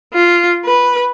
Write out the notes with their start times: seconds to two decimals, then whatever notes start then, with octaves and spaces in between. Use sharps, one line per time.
0.14 F4
0.66 B4